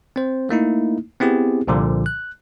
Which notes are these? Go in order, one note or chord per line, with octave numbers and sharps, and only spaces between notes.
C4 C5
A3 A#3 D#4 E4
B3 C4 E4 G4 G#4
C2 A#2 D3 F3
F#6